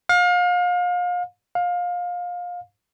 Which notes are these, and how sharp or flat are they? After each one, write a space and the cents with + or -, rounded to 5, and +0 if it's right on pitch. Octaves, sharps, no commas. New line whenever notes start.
F5 +35
F5 +25